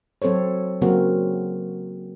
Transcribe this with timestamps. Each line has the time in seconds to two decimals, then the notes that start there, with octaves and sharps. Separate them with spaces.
0.22 F#3 C4 A4 C5 C#5
0.82 C#3 F#3 A#3 C4 F#4 A#4